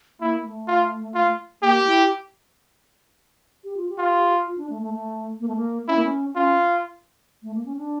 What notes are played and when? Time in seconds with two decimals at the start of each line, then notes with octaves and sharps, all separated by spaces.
0.20 A#3 E4
0.45 A3
0.68 F4
1.15 F4
1.62 A#3 G4
1.86 E4
3.64 G4
3.77 F4
3.89 G4
3.98 F4
4.47 F4
4.58 D4
4.70 A3
4.82 A3
4.94 A3
5.40 A#3
5.48 A3
5.56 A#3
5.87 C#4 E4
5.96 A#3
6.04 C#4
6.34 C#4 F4
7.43 A3
7.55 A#3
7.66 C#4
7.77 D4